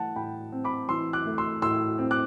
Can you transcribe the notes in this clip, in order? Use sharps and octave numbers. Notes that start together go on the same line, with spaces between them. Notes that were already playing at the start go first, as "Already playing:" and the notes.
Already playing: E3 A3 F#5 A5
A2 G5 B5
C4
B5 D6
E3 C6 E6
D6 F#6
A3
C6 E6
A2 C6 E6
C4
D6 F#6